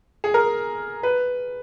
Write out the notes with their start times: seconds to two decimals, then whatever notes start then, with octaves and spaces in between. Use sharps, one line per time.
0.24 G#4
0.34 A#4
1.03 B4